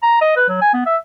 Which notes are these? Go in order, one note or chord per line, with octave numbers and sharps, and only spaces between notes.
A#5
D#5
B4
F#3
G#5
B3
E5